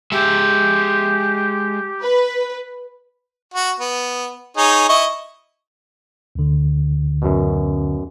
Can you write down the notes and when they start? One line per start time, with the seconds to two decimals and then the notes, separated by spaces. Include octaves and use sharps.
0.12 G#3 G4 E5
2.02 B4
3.54 F#4
3.80 B3
4.57 D#4 G#4 C#5
4.89 E4 D#5 C#6
6.35 D2 D3
7.22 F#2 B2